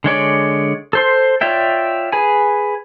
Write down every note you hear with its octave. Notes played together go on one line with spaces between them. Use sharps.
D3 G#3 C#5 D5
A4 C5 C6
F4 C#5 D5 E5 G5
G#4 B4 G#5